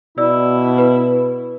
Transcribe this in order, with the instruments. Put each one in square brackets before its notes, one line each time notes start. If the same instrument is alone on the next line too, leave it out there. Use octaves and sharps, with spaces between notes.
[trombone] B2 [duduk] E4 [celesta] D5 E6
[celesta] B4